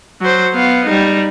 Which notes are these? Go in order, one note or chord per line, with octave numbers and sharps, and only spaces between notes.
F#3 C5
B3 F5
G3 D#4